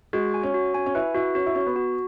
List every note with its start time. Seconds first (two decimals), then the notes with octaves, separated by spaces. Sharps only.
0.13 G#3 F#4
0.34 G#5
0.43 C#4
0.54 F#4
0.74 C#4 G#5
0.86 C#4
0.95 E4 B4
1.15 E4 F#4
1.35 C#4 F#4
1.46 E4
1.55 C#4 F#4
1.67 B3
1.76 F#4